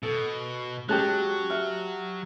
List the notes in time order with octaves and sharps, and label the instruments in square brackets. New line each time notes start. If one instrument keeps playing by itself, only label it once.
[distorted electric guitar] B2 [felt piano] A4
[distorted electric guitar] F#3 [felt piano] G#3 C#4 [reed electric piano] G4 A5 F#6
[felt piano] E5 F6